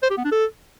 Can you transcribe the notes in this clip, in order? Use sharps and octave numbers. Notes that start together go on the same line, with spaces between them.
C5
G4
B3
D4
A4